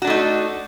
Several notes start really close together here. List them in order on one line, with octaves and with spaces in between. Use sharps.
F#4 D4 A3 D#4